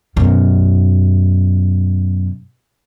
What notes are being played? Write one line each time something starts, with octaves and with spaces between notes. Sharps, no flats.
F#2 B2